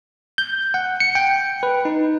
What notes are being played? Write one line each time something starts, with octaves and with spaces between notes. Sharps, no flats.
G6
F#5
C#7
G5
B4
D#4